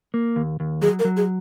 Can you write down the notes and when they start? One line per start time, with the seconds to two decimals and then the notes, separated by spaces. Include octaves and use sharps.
0.14 A#3
0.36 D#2
0.60 D#2
0.82 F#3 G#4
0.99 A#4
1.05 F#3
1.17 G#4